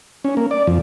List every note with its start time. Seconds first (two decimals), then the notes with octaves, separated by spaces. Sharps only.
0.25 C#4
0.37 A#3
0.51 D5
0.67 F2